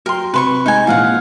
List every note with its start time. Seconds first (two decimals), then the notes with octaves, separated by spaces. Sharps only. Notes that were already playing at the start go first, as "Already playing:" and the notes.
0.06 F#3 A#4 G5 C6
0.34 C3 C4 B4 C6 C#6
0.66 G#3 D#4 G#5
0.87 A#1 E3 G#3 F4 F5 F#5